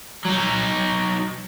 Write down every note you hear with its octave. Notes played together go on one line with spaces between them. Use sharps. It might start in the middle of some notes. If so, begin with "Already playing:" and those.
F#3 D#4